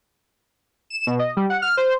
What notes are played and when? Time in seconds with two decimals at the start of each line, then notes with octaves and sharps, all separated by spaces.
0.90 E7
1.07 B2
1.19 D#5
1.37 G3
1.50 F#5
1.62 F6
1.77 C5